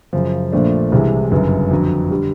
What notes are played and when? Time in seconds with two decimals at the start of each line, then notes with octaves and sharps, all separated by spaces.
0.13 F#2 C#3 F3
0.52 A#1 A#2 F3 A3 D4
0.92 C2 C3 E3 G#3
1.31 G1 F#2 C#3
1.71 F2 D3 F#3
2.11 D3 G3